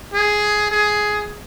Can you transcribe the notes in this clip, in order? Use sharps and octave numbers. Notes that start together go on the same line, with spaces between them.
G#4
G#4